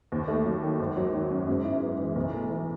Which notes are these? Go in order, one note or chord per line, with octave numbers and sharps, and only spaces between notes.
D#2
A3
F#3
D#3
G#1
F#3
D#3
F#2
G#2
E4
B3
E3
B1
A3
E3